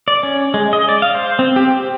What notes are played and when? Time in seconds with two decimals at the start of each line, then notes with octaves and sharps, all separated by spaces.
0.08 D5
0.23 C#4
0.54 G#3
0.73 D#5
0.89 D5
1.02 F5
1.15 C5
1.39 C4
1.56 G4
1.72 G4